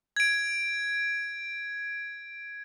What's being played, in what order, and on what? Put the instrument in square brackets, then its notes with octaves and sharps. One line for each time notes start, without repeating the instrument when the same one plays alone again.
[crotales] G#6 D7